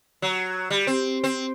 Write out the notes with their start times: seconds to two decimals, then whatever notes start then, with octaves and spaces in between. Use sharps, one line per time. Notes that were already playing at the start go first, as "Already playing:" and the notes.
0.22 F#3
0.70 G3
0.87 C4
1.24 C4